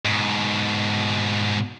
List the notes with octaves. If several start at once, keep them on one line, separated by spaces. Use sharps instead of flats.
G#2 B2